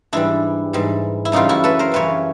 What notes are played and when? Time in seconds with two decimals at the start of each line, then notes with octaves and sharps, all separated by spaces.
0.13 G#2 E3 G3 D4 E4
0.73 G#2 E3 G3
1.25 E4
1.32 F#2 C#3 E3 G3 D#4 F4
1.49 E4 F#4
1.64 A4 B4
1.79 A#4 C5
1.92 F#2 C#3 E3 G3 B4 C#5